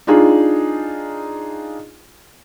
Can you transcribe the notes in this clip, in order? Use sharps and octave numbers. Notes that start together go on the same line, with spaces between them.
D4 D#4 F4 G#4